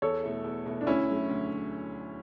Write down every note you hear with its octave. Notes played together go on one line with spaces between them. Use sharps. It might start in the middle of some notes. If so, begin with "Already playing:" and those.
E2 A4 C#5
B2 A3 E4
E2
B2 A3 E4
D4
D2 C#4 E4
D3 F#3 A3
D2